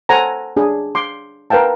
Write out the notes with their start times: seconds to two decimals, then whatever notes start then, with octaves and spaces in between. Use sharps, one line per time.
0.09 A4 C5 F#5 G#5 A#5
0.57 D4 G#4
0.95 C6 D6
1.50 A#4 B4 F5 G5 A5